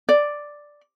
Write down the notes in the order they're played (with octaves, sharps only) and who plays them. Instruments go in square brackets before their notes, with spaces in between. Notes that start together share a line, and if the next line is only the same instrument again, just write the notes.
[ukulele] D5